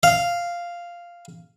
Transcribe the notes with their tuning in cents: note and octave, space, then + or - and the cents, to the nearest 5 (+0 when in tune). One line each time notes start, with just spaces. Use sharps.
F5 -5